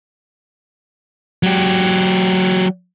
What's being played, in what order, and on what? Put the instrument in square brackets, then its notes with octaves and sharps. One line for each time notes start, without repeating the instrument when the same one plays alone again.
[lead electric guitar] F#3 G4